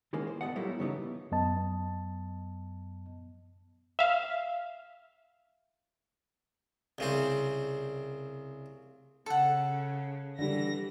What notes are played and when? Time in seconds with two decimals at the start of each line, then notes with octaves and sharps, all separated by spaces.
0.13 D#3 E3 G#3 A#3 C#4
0.27 C5
0.41 A2 B3 D5 D#5 F#5
0.56 F#3 G3 A3 A#3 E4 F4
0.79 G2 C#3 E3 B3 D#4
1.32 F#2 B3 D#5 A5
3.99 E5 F5
6.98 C2 C#3 C4
9.26 C#3 A4 F#5
10.39 D3 E3 G3 A#6